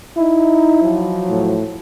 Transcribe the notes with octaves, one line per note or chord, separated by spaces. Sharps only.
D#4 E4
F3 F#3
A2